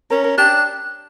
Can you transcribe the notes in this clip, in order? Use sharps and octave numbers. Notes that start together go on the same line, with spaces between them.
C#4 A#4
A#4
D4 G4